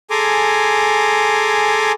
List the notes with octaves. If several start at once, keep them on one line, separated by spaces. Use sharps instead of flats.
G#4 A4 G#5 A#5 C6 D6